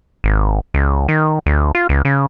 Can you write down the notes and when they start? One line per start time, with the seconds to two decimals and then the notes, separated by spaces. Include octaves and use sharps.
0.24 G#1
0.74 C#2
1.08 D#3
1.46 D2
1.75 F4
1.89 C#2
2.05 C#3